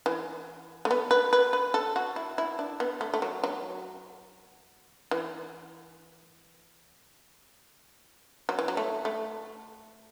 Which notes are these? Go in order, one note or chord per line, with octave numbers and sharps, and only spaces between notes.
E3
A3
B3
B4
B4
B4
A4
F#4
E4
E4
D4
B3
A3
A3
F#3
F#3
E3
F#3
E3
F#3
A3
A3